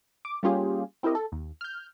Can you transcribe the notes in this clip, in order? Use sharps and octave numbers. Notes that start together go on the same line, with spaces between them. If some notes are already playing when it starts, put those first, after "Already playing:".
D6
G3 A#3 C#4 F4 G4 G#4
C4 E4 G4 A#4 D#5
A4
D#2
F6 G6